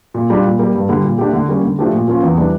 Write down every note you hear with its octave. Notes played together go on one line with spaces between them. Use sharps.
A#2
G3 D4 F4
A#2
G3 A#3
G2
D3 G3
A#2
A3 D4 G4
D3
G3 A#3 C#4
D3
F3 A3 D4 G4
A#2
F3 A#3 C#4 F4
E2
E3 G3 D4